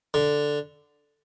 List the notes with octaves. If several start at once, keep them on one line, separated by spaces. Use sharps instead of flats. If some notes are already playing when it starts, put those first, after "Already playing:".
D3